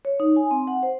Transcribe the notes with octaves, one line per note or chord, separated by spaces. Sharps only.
C#5
D#4
G#5
C4
F#5
C5